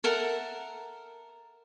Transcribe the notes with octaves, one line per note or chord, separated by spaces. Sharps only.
A4 A#4 E5 F#5